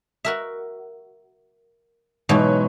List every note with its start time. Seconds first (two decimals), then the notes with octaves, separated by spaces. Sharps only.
0.25 F#4 A#4 E5
2.29 G#2 B2 E3 F#3 C#5